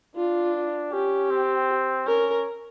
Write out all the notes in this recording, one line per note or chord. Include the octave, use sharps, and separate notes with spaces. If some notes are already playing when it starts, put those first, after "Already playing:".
D4 F4
C#4 G4
C4
C#4 A#4